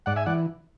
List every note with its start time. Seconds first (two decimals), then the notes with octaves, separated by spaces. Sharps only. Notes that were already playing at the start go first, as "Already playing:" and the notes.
0.06 G#2 D5 F#5
0.16 E5 G#5
0.26 E3 D5 F#5